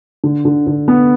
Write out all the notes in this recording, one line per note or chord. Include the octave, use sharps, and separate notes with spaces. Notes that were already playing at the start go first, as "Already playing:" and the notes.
D3
D3
D3
B3